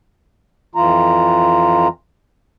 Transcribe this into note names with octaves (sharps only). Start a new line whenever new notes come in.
F2 E3 F4 A#5